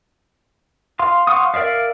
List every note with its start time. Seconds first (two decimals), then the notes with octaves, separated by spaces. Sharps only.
0.99 F5 C6
1.27 F5 F#5 C6 C#6 D#6
1.54 A#4 D5 E5 F5